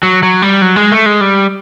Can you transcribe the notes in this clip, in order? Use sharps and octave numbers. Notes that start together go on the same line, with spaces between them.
F#3
F#3
G3
F#3
G#3
A3
G#3
G3